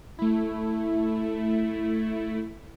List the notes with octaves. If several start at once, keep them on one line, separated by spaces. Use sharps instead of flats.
A3 E4